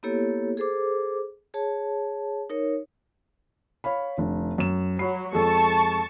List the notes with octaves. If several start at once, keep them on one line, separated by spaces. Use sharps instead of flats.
A#3 B3 E4 G4 A4 C#5
G#4 A4 C5 D6
G#4 C#5 A5
D#4 A#4 C#5
C#5 F5 B5
F1 D3
F#2 E7
F#3 B5 C7
F2 G#3 A4 A5 C#6